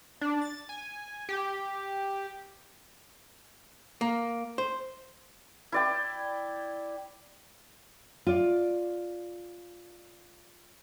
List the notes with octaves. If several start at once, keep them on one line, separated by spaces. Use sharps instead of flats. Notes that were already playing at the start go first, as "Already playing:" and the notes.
D4
A6
G#5
G4
A#3
C5
E4 D5 G5
F4 D5